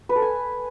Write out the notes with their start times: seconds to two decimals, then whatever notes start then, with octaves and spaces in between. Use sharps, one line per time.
0.09 B4
0.16 A4
0.22 G#5